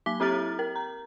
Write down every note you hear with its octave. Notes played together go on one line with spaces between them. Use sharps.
F#3 A#3 D6 B6 G7
C4 E4 G4 A#5 F6 A6
A#4
A#5